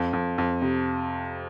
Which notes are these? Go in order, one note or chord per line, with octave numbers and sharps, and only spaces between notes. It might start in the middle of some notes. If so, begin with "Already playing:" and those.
Already playing: F2
F2
F2
C3